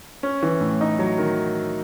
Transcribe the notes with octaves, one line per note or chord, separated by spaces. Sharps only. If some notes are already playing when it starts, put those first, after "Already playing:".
C#4
E3
A2
D#4
F#3
D#3